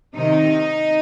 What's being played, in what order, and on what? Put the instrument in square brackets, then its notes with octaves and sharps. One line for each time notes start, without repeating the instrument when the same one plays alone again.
[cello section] C3 D#3 D#4